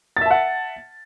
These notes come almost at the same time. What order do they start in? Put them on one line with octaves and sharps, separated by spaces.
A6 E5 A5 F#5